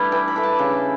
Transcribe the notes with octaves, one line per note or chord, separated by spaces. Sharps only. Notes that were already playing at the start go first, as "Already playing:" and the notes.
Already playing: G3 A3 D4 E4 B4
E3 G5
B5
A3 D4
A5
C#3 G5